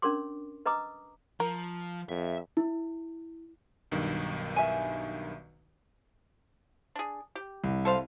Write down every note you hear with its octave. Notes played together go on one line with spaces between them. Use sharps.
C#4 D4 A#4 C#5 C6 D6
B4 D#5 A#5 D6 D#6
F3 A#4
F2 E5
E4
B1 G2 D#3
E5 G#5
D4 G#4
G4
C2
A4 C5 F5